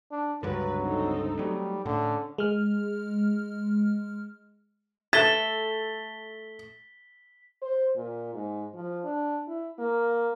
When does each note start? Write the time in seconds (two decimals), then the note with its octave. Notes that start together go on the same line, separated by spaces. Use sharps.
0.11 D4
0.43 C#2 G2 D3 F#3 B4
0.80 C4 D#4 A4
1.39 F#3 G3 A3
1.86 A2 D3 C#4
2.38 G#3 F6
5.13 A3 A4 A6 B6 G7
7.62 C5
7.97 A#2
8.34 G#2
8.74 F3
9.05 D4
9.48 E4
9.79 A#3